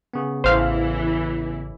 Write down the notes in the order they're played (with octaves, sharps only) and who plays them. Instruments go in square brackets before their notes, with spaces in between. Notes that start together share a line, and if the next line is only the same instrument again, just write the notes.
[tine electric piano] C#3 B3
[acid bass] A1 [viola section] E3 E4 [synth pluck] C5 F5